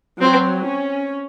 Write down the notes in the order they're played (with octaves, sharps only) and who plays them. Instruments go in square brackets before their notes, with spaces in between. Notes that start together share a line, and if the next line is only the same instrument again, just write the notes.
[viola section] F#3 [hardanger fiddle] C4
[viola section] C#4